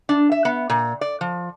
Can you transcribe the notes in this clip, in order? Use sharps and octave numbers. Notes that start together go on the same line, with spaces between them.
D4
E5
B3
A#2
D5
F3